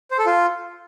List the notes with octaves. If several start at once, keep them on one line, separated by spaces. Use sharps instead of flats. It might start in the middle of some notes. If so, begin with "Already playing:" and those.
C5
A4
F4